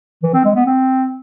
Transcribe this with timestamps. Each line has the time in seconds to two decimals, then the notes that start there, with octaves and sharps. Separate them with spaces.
0.23 E3
0.34 C4
0.44 G#3
0.55 B3
0.66 C4